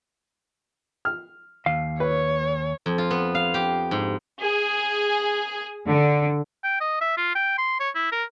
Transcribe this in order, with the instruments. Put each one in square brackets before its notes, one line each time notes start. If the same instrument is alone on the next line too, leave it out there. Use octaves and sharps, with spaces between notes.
[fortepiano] F6
[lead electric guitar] D#2 [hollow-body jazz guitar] F5
[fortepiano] B4 [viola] C#5
[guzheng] F2
F4
B3
F5
G4
G#2
[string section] G#4
D3
[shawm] G5
D#5
E5
F4
G5
C6
C#5
E4
A#4